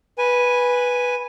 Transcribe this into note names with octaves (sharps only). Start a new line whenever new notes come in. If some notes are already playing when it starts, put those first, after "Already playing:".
B4 G#5